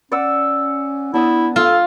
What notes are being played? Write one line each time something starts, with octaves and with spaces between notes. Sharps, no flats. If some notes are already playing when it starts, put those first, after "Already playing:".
C#4 D5 F#5 E6
B3 D4 E4 A5 D#6
F4 A4